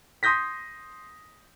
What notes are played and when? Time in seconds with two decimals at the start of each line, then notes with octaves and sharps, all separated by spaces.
0.23 C6 D#6 G6 A#6 B6